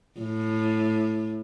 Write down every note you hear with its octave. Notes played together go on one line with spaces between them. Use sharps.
A2